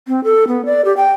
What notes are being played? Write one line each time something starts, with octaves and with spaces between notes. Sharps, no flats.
C4
A4
B3
D5
G4
G5